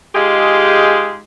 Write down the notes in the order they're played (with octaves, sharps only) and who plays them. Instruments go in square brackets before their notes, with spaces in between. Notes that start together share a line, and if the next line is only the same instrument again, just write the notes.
[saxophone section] G#3 D#4 F4 G4 G#4